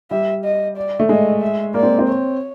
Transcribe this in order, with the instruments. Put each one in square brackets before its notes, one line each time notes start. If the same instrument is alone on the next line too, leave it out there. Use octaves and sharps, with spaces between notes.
[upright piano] G3 [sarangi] E5
[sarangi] D#5
D5
[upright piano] A3
[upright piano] G#3 [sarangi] D#5
[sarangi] E5
[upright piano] A#3 [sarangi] D5
[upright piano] C4
C4
[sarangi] C#5